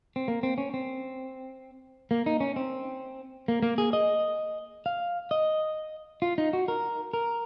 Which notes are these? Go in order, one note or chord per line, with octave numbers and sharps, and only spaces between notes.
C4
A#3
C4
C#4
C4
A#3
D#4
C#4
C4
A#3
A#3
G#4
D#5
F5
D#5
F4
D#4
F#4
A#4
A#4